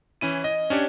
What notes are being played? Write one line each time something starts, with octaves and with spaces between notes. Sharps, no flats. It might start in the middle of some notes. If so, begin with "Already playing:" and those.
E3 C#4 E4 D#7
D#5
C#4 D4 G4 C#5